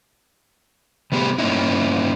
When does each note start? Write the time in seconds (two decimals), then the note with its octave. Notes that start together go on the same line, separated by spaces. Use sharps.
1.12 C3 G3 B3 F4 G4 G#4
1.38 G2 A#3 C#4 D#4 E4